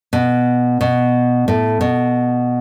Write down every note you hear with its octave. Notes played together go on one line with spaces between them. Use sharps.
B2
B2
A2
B2